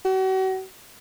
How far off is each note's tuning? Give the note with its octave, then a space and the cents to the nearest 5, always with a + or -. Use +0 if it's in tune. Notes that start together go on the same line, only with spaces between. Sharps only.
F#4 +40